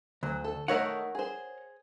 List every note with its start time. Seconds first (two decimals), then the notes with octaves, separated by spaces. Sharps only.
0.23 D2 F#3
0.44 A4
0.68 D#3 A3 D#4 A#4 C#5 F#5
1.15 G#4 C5